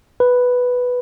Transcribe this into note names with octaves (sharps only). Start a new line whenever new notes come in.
B4